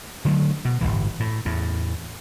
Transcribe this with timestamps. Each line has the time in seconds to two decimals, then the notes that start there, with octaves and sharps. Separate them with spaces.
0.25 D3 D#3 F#3 A3
0.65 B2
0.81 G1 C2 A2 E3
1.20 A2
1.45 E2 A2